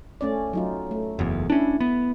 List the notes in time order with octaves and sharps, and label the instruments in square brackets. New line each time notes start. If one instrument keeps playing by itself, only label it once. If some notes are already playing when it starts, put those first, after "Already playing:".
[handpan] A3 C#4 D5
F#3 D#4 F4
A3
[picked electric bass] F#1 E2
[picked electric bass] C#4 D4 [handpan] E4
[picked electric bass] B3